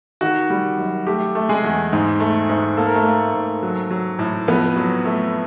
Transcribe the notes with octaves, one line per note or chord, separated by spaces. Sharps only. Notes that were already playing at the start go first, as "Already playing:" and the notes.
D#3 F#4
G3
F#2
A3 G4
A3
G#3 G#4
E2
G#2
A3
G#2
A#3 A4
A#4
A3 A4
A#3
G#2
F#3
F#3
A2
F2 B3 B4
F#3
A3